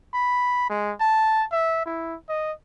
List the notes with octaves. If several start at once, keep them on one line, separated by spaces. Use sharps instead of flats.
B5
G#3
A5
E5
E4
D#5